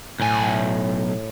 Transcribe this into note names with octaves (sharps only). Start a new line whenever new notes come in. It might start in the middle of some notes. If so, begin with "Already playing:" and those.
B1 A2 G#5